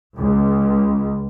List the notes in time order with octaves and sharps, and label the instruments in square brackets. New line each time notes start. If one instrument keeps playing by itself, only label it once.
[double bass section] C#2